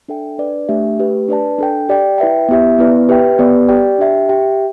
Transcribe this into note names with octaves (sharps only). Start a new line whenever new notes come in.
D4 A4 E5 G5
D4 B4 D5
A3 D4 G4 E5
A3 G4 B4
D4 B4 D5 A5
D4 A4 G5
G4 D5 G5
E4 B4 E5 G5
B3 E4 G4 E5
B3 E4 B4 D5
G4 B4 E5 G5
B3 G4 B4 D5
G4 D5 G5
D4 G4 E5 G5
G4 E5 G5